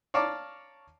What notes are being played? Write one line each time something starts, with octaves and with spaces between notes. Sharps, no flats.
C#5 D5 F5 A5 A#5 D6